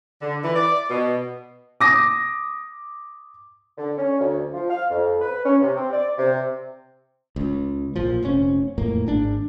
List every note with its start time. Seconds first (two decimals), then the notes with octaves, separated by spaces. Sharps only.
0.22 D3
0.44 E3
0.56 D5
0.90 B2
1.81 D6 D#6 A#6
3.78 D3
3.97 C#4
4.20 D2
4.53 F3
4.69 F5
4.90 F2
5.22 B4
5.45 C#4
5.62 C3
5.76 C4
5.93 D5
6.18 C3
7.36 C#2
7.96 A#1 A#2 F3
8.23 F1 C4 C#4
8.78 F2 A2 A#3
9.06 G#1 G#2 D4